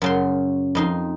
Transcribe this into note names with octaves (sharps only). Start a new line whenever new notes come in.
F#2 C#3 C6
F2 D#4 C6